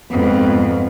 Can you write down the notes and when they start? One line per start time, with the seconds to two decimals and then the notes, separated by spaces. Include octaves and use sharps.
0.10 F2 G#2 B3